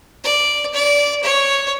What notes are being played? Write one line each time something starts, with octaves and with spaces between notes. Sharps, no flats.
D5
D5
C#5